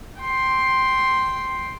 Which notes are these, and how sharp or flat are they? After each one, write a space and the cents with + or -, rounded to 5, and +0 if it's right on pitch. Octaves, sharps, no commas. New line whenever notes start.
G5 +0 C6 +5